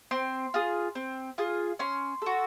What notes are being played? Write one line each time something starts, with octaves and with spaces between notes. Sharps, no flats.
C4 C6
F4 G#4
C4
F4 G#4
C#4 C6
F#4 A4